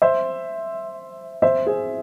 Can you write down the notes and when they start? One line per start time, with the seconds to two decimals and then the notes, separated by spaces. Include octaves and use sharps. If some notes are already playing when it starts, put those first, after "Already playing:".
0.02 C5 E5
1.42 C5 E5
1.66 G#4 C5